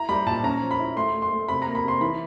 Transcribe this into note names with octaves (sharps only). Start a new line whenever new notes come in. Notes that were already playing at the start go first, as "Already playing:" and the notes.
Already playing: E4 A#5
G3 B5
A#2 A5
C#4 A#5
F3
B5
E4
A3 C6
A3
C6
A3
C3 B5
A#5
A#3
B5
C3 C6
E3 B5